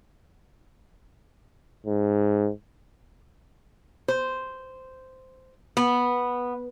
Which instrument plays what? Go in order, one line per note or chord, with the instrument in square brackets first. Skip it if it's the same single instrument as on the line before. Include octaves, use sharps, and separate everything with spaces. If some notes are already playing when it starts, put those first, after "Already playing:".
[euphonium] G#2
[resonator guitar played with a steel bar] C5
B3